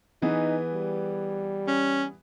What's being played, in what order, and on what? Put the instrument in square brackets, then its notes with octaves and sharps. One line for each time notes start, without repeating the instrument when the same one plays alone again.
[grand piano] E3 B3 G#4 [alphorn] D#4
[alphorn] G3
[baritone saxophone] C#4